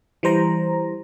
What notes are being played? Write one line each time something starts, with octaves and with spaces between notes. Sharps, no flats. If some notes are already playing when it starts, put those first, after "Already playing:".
E3 G3 C5 A#5